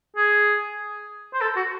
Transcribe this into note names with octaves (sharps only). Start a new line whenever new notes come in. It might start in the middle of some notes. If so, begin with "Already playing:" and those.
G#4
C5
A4
F#4